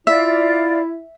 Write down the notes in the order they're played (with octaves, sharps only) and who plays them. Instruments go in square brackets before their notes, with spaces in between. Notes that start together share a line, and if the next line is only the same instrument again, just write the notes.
[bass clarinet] E4 [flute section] F4 D5 [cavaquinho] E5